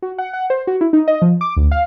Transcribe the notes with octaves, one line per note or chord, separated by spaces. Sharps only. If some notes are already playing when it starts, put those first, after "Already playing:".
F#4
F#5
F#5
C5
F#4
E4
D#4
D#5
F3
D6
D2
F5